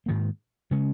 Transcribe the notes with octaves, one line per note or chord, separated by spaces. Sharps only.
G#2 D#3 A#3
C#3 G#3 C#4